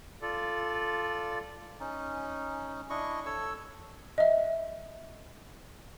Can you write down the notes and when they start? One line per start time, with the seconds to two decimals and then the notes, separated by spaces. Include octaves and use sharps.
0.22 F4 A4 D5
1.80 C#4 D#4
2.90 D4 E4 D#5 C#6
3.26 A4 C#5 E6
4.18 D#5 E5